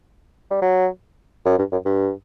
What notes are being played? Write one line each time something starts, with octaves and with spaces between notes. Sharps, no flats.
G3
F#3
F#2
G2
F#2
G2